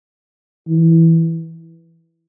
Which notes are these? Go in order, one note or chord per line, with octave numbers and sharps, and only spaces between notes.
E3